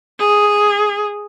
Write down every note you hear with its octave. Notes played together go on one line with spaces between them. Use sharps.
G#4